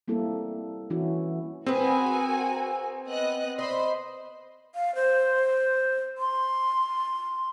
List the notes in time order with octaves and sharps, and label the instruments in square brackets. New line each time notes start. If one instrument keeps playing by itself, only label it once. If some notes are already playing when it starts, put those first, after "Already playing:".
[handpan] G3 A#3 C4 E4 A4
E3 C#4 E4 F#4
[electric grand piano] C4 [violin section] F#4 A#4 G#5 [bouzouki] G#4 B4
[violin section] B3 D#5 F#6
[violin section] C5 B5 C6 [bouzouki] D#5
[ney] F5
C5
C6